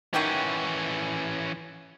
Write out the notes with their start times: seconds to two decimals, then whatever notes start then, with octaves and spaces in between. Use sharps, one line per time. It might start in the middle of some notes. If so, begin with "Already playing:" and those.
0.14 D#3 E3 C#4 F#4 G4